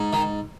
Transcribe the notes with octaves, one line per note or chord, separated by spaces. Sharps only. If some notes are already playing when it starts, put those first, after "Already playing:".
Already playing: G#2
D#3